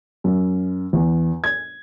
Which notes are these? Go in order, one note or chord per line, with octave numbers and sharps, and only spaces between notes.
F#2
E2
G#6